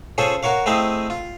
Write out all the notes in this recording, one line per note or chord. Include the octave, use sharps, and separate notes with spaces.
C#4 F4 G#4 A4 C5 G#5
F#4 A#4 C#5 F5
A3 C4 E4 G#4 D#5 F5
F4